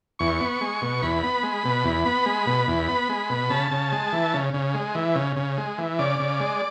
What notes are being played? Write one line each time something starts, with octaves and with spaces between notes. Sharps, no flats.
E2 C#6
B3
G#3
B2
E2 B5
B3
G#3
B2
E2
B3
G#3
B2
E2
B3
G#3
B2
C#3 A5
C#3
G#3
E3
C#3
C#3
G#3
E3
C#3
C#3
G#3
E3
C#3 D5
C#3
G#3